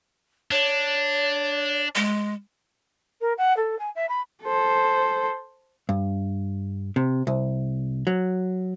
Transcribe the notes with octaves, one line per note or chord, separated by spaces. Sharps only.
D4 C#5
G#3
A#4
F#5
A4
G#5
E5
B5
A4 C5
G2
C3
C2
F#3